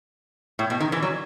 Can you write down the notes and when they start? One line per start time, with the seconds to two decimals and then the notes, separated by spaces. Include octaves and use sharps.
0.59 A2
0.70 B2
0.80 D#3
0.92 E3
1.02 F#3